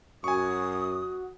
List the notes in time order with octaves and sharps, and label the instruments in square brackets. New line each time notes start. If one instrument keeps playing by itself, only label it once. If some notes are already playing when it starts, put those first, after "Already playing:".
[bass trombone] F#2 [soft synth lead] F#4 [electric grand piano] G#5 C#6 [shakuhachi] D#6